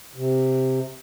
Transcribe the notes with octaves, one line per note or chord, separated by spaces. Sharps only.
C3